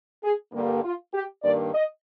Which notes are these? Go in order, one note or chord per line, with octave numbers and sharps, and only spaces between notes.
G#4
G2 D3 G3 A#3
F4
G4
G2 D#3 A#3 D5
D#5